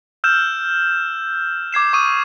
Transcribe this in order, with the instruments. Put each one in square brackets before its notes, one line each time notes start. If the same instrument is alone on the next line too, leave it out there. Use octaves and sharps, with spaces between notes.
[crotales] E6 F6 G6 E7
D6 G#6 C7 E7
C#6 D#6 D#7